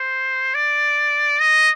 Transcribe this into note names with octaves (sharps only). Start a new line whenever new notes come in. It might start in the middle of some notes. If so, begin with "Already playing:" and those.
Already playing: C5
D5
D#5